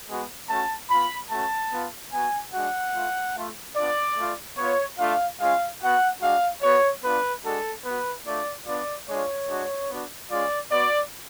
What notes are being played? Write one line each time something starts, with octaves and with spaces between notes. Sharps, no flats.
G#3 B3 F#4
A3 C#4 F#4 A5
B3 F4 B5
A3 C#4 F#4 A5
B3 F4
B3 F#4 G#5
G#3 D4 F#4 F#5
A3 F4
A3 F4
B3 D4 F4 D5
A3 F4
B3 F4 C#5
A3 D4 F4 F5
G#3 C#4 F4 F5
B3 F#4 F#5
G#3 D4 F#4 F5
B3 F#4 C#5
B3 D4 F4 B4
G#3 D4 F#4 A4
B3 F#4 B4
A3 D4 F4 D5
B3 D4 F4 D5
G#3 D4 F4 C#5
G#3 D4 F#4
B3 D4 F#4
G#3 C#4 F4 D5
B3 F#4 D5